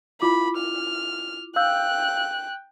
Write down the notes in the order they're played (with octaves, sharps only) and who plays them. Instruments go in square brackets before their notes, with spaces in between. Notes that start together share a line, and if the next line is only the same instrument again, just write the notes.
[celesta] E4 F4 D6 [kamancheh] B5
[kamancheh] F6
[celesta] F5 E6 G6 [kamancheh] G5 F#6